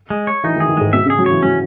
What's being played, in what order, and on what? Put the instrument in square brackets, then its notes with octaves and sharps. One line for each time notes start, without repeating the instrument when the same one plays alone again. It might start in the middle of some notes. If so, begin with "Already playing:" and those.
[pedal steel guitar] G#3
C#5
[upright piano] E3 [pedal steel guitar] D#4
[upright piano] D#3
[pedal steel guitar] G#4
[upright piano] D#3
[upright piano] G#2 [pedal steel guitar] G#3
[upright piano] B2 [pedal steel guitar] E5
[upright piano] C#3
[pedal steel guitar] G#4
[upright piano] F#3
[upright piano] E3 [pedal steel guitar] C#5
[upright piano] F#3 [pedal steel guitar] C#4